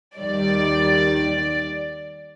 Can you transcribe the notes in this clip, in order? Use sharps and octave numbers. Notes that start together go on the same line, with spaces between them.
D#2 D#3 G3 D5